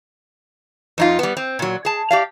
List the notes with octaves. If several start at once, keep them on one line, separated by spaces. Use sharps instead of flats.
F2 D#4 F4
G3 B3
C4
A#2 F#3
G#4 A5
G4 D5 F5